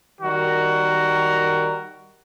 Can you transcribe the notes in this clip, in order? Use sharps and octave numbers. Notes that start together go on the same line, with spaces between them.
D#3 G3 F#4 A#4